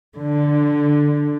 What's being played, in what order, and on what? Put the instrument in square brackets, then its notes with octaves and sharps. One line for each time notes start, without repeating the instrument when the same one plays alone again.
[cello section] D3